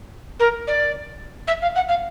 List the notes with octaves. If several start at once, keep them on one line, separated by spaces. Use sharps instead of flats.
A#4
D5
E5
F5
F#5
F5